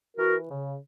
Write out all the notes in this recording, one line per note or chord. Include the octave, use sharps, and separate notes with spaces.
E3 F#4 A#4
C#3